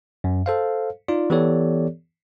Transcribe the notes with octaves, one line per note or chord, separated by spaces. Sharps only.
F#2
A4 C5 F5
D#4 F4 D5
E3 B3 G4 A4 C#5 D5